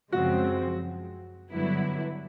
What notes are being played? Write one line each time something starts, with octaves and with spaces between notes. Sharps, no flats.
F#2 C#3 F3 G#3 C4 F#4
G2 D3 F#3 B3 E4